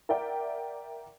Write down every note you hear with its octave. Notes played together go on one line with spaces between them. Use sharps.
A#4 D5 E5 F#5 G5